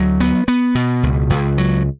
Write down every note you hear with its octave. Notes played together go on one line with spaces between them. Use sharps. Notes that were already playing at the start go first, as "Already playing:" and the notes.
Already playing: D2 F#3
B3
B3
B2
C#2
C#2
F#3